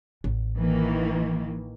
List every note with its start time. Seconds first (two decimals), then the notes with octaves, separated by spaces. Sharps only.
0.24 A1
0.57 D#3 E3 A#3